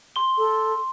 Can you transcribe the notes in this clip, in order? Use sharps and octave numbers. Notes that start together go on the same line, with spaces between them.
C6 G7
A4